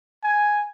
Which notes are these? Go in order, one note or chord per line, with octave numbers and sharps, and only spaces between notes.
G#5